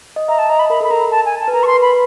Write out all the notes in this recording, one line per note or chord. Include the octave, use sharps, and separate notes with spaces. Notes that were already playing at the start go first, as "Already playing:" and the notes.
D#5
E5 A#5
A5
D#5 A#5
B5
A#4 B5
A4 B5
A#4 A#5
A5
G#5
A5
B4
A#4 A#5
C#6
C6
B4
B5